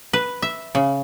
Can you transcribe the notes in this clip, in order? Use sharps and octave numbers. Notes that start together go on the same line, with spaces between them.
B4
E5
C#3